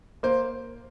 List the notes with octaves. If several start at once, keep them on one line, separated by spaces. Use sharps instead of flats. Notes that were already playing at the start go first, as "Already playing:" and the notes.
A#3 C5